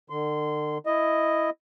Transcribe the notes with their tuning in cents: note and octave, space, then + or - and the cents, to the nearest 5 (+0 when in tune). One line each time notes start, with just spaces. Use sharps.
D3 +45 C6 -20
E4 +0 D#5 +0